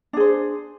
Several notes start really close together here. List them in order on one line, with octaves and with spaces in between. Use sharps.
D4 G#4 C5